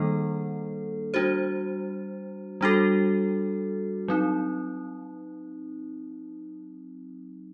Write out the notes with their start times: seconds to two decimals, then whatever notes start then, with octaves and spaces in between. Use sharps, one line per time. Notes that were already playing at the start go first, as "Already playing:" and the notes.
Already playing: D#3 G3 A#3 D4 A4
1.14 G3 D4 F#4 C5
2.61 G3 D4 F#4 A4
4.08 F#3 C4 D#4